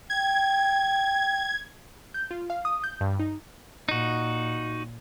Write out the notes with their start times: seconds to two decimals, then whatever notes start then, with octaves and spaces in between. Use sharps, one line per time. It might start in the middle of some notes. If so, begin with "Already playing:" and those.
0.10 G5 G#6
2.14 G6
2.31 F4
2.50 F5
2.65 D#6
2.84 G6
3.01 G2
3.19 D#4
3.89 A#2 D#4 F#4